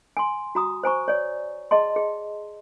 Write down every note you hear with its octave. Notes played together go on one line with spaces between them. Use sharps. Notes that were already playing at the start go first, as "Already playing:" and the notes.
G#5 C6
F#4 A#5 D#6
C5 G#5 A#5 C#6
C#5 D5
G#4 D#5 A5 C6
G#4